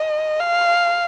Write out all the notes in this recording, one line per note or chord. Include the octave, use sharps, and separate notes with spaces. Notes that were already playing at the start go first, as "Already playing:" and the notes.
Already playing: D#5
F5